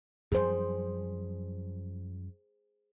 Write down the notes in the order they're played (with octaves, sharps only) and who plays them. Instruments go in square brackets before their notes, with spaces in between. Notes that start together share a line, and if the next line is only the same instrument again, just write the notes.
[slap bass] F#2 F3 G3 [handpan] G#4 C5